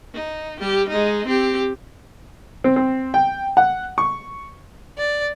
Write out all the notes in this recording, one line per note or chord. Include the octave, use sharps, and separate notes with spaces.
D#4
G3 G4
G#3 D#4
C4 G4
C4
C4
G5
F#5
C#6
D5